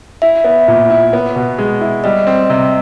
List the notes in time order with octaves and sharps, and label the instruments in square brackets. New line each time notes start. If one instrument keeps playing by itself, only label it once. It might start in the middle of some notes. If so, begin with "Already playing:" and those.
[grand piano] E4 [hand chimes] E5
[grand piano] B3
A#2
E4
B3
B2
G#3
E4
[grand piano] G3 [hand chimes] D#5
[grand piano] C4
C3